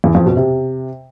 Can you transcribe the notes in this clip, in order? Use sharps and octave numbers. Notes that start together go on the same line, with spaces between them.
E2
F2
B2
C3